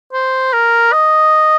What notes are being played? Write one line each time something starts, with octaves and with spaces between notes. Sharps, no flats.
C5
A#4
D#5